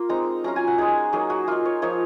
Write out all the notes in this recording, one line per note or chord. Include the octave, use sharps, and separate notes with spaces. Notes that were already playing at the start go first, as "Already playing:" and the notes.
Already playing: A#3 F4
G#3 C4 D#4 A#5
F#3 C#4 F4 A#5
G#5
F#5
G#3 D#4 G#4
F#3 A#3 D#4 G#4
F#4
A#3 D#4 F4
C#5
F3 A#3 D#4 C#5